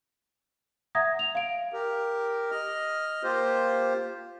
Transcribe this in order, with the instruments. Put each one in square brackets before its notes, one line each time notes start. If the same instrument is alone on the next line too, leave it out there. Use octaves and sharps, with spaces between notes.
[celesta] E5 F#5 A#5 D#6 G#6 A#6
F7
F5 D7
[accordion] G4 A#4
D#5 F6
A#3 F4 G4 C5